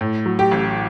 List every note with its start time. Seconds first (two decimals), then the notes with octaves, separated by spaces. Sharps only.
0.01 A2
0.26 F#3
0.39 G4
0.52 A1